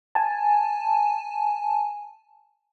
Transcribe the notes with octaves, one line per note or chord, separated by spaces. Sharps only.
G#5 A5